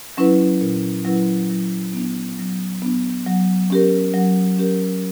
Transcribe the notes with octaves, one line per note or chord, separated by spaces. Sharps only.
F#3 C#4 E4 B4
A#2
F#3 C#4 E4 B4
F#3
B3 D4
F#3
B3 D4
F#3
C#4 G4 A#4
F#3
C#4 G4 A#4